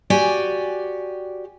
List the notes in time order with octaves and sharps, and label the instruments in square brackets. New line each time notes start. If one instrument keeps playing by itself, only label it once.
[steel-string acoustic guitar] F#4 G4 D5 G#5